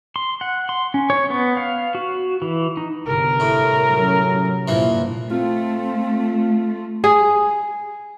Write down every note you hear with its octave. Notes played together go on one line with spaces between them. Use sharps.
C6
F#5
C6
C#4
C#5
B3
F5
F#4
E3
D#4
G1 C3 A#4
A2
F#3 C#4
A#1 G2 A#2 E3 F3
A3 C4 F4
G#4